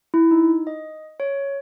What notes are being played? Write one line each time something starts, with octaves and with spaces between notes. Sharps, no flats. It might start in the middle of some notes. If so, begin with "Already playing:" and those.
E4
D#4
D#5
C#5